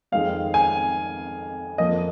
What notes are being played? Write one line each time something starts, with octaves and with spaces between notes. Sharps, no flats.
F2 D#3 G#3 C4 F5
G#5
F2 F3 A#3 D#5